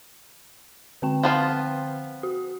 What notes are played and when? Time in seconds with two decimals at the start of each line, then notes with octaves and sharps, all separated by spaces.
1.02 D3 C4 G5
1.23 F3 B3 F4
2.23 F#4